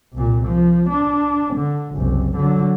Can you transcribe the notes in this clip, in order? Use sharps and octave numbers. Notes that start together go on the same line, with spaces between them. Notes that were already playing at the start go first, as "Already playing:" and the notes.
C2 A#2
F3
D4
D3
F#1 C2
D3 F#3